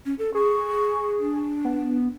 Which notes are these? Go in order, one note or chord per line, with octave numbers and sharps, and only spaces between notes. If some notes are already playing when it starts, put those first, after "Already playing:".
C#4
A4
G#4 C#6
D4
B3